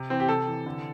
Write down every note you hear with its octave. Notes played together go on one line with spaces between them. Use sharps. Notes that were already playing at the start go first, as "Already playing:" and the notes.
Already playing: C3
E3 C4
G4
C3 A4
E3
D3